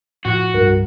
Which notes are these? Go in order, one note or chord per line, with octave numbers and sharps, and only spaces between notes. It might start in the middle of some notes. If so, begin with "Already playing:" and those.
A2 F3 F#4
C2 G2 A#4